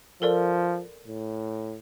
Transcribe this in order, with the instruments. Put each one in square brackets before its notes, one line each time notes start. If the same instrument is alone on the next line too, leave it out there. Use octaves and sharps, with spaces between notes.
[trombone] F3 [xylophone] A4 A#4 D5
[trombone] A2